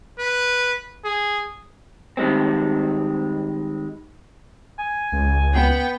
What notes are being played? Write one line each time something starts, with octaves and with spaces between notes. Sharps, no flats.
B4
G#4
D#3 G3 G#3 C4
G#5
C#2
B3 G5